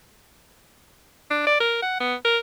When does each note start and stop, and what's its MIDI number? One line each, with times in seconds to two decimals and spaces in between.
1.31 1.42 62
1.47 1.56 74
1.60 1.78 70
1.83 1.97 78
2.00 2.15 59
2.25 2.38 70